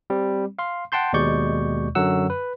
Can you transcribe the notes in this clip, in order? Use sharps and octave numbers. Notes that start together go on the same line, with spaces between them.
G3 C4
F5 C6
F#5 G5 A5 C6 G6
D#2 B2 G#3 D5 C#6 G6
F#2 D3 F#3 F#5 E6
B4